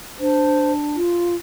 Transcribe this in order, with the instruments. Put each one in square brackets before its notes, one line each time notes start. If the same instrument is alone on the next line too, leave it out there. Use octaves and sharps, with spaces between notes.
[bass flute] D4 [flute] C5
[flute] F4